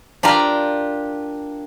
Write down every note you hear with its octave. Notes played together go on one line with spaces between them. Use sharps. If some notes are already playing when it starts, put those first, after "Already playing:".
D4 F4 G4 A#4